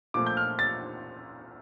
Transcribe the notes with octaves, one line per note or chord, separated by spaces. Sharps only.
A#2 F3 A3 D6
G6
F6
A6